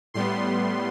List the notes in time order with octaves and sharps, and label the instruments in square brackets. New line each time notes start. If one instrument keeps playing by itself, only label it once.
[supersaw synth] A2 G3 B3 C6